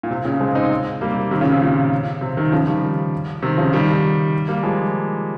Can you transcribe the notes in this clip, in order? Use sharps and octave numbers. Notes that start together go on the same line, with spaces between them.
A#2
C3
A#2 C#3
G#3 C4
C4 D#4
G3 A#3
C3
C3 D#3
A#2 C#3
C3
A#2
C3
C3 D#3
C#3 F3
D#3 G3
C3 D#3
C#3 F3
D#3 G3
G3 A#3
F3 G#3